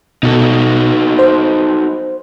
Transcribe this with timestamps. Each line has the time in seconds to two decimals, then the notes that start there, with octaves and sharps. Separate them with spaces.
0.23 B2 D#4 F#4 A4
1.19 C5